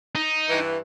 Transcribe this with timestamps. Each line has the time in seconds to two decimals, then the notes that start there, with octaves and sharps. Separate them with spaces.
0.15 D#4
0.49 G2 E3